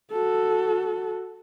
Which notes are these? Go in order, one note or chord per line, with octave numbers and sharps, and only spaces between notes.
F#4 A4